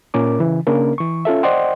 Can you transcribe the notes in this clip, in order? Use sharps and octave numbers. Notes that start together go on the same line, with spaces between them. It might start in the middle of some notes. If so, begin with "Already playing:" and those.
A#2 C#4 A#4 D6
C#3 E3
C#3 A#3 C#4 D4 A#4
E3 C#6
C#4 F4 A4 E5
C5 D5 D#5 F#5 G5 C6